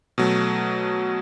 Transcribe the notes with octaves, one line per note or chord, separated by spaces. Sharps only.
B2 F#3 A3